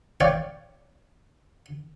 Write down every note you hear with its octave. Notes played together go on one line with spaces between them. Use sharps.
C#5 D5 F5 G5